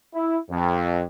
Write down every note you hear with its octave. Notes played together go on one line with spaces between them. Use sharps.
E4
F2